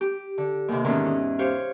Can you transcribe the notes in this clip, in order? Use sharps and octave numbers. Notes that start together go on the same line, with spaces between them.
G4
D3
D#2 C3
E2 G#2 D3 D#3 C#4
C#4
G4 C5 C#5 F5